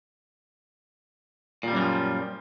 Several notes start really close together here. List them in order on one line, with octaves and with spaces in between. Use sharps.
A#2 G3 F#2 E3 F3